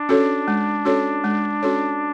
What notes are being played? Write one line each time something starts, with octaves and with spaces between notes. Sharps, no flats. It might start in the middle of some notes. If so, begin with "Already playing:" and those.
Already playing: D4
C#4 F#4 A4 C#5
G#3
C#4 F#4 A4 C#5
G#3
C#4 F#4 A4 C#5